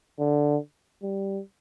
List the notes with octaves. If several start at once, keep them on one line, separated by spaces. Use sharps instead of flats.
D3
G3